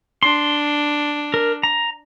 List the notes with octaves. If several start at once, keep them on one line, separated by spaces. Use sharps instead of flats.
D4 C6
A#4
A#5